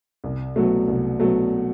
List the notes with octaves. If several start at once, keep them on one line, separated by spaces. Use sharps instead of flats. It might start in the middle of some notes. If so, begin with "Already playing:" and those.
C2
B2 F#3 A3
C2
B2 F#3 A3